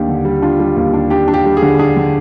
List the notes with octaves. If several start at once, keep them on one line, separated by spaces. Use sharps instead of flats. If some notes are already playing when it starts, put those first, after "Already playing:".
Already playing: D#2 D4 G4
D3
G3
D4 F4
G3
D#2
D4
D4 G4
D4
G4
G3
G#4
D3
D4 G#4
D3